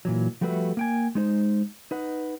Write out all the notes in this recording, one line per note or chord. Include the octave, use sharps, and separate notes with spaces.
A#2 E3 F#3
F3 G3 A3 F#4 B4 E5
A#3 G5 G#5
G#3 D#4 C5
D#4 B4 F#5